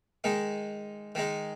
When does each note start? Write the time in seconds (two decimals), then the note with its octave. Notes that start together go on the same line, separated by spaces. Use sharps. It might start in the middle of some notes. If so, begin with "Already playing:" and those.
0.24 D#3 G#3 D#4
1.15 D#3 G#3 D#4